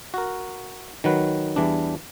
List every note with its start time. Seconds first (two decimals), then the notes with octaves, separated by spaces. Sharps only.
0.14 F#4 A#4
1.04 D#3 F#3 B4
1.56 E2 E3 G3 D4